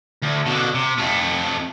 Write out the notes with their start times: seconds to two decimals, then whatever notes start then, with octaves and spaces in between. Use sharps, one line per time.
0.23 D2
0.46 B2 D3
0.74 C3
0.98 F2 A3